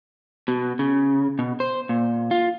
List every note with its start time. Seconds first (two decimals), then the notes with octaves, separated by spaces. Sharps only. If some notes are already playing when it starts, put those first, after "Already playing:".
0.48 B2
0.79 C#3
1.39 B2
1.60 C5
1.89 A#2
2.31 F4